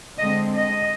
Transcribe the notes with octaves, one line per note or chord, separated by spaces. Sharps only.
D3 G#3 C4 D#5
D#5